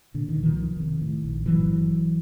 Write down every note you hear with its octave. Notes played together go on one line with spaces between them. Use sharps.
A#2 D3
D#3
C2
D#3 F3
F1
C3
A2
A#1
G1 E3 F#3